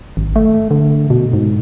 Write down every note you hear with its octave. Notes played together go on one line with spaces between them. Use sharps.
G#1
A3
D3
B2
G#2